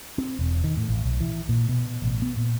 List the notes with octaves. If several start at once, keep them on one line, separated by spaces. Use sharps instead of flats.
C4
E1
D#3
A2
A1
B1
E3
A#2
B2
A1
B3
A#2